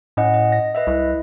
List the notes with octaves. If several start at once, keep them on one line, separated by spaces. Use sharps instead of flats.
A2 C#4 D#5 F#5
D#5
A#6
B4 D#5 E5
C2 E4